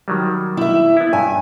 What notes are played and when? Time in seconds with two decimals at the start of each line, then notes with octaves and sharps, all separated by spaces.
0.08 D#3 F#3 G3
0.57 E4 E5
0.97 B3 E4
1.13 G2 G#5